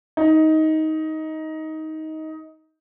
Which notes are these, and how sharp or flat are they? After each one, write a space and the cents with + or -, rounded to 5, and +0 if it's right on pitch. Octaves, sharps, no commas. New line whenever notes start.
D#4 +15